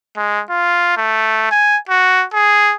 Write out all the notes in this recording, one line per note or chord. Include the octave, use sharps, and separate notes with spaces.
G#3
F4
A3
G#5
F#4
G#4